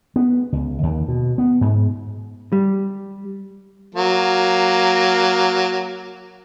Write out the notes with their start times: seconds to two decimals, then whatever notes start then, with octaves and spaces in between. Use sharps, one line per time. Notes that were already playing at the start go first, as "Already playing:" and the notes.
0.16 B3
0.52 C#2
0.83 D#2
1.08 B2
1.38 B3
1.61 G#2
2.52 G3
3.95 F#3 A#3